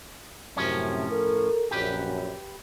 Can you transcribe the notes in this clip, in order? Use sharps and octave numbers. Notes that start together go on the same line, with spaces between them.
F#2 A2 C3 F3 C#4
A4 A#4
A#1 F#2 G4 B4